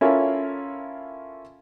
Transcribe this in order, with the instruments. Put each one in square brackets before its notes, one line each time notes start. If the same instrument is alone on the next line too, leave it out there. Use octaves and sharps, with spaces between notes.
[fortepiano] C#4 E4 F4 A4 A#4 C#5